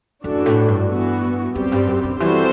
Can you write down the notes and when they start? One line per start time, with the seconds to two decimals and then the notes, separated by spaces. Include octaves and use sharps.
0.24 F#2 E3 A3 D4 F#4 A4
0.46 A2
0.68 G2
0.89 E3 B3 F#4
1.55 F#2 G3 C4 G4
1.72 G2
1.87 F#2
2.04 D3
2.20 E3 G3 C4 F#4 A4 C5